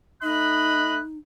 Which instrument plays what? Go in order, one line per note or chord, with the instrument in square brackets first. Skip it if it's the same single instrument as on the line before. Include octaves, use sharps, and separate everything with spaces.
[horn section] A3 D#5 B5 [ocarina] D#4 [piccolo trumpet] F#6